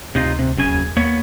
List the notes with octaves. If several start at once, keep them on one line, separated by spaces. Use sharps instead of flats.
D2 C3 D#4 F4
C3
F#1 F#2 C#3 G#5
D#2
D#2 A#3 B3 C#5